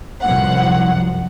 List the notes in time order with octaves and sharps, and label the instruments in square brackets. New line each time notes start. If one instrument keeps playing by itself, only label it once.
[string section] C2 F#2 F3 F#5